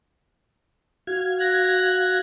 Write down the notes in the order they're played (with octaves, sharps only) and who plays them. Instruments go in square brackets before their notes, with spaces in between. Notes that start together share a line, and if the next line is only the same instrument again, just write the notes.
[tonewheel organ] F#4 F5 G#6
[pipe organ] F#6 A#6